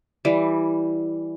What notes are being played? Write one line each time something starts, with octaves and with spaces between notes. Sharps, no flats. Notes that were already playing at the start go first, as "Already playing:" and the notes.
E3 G3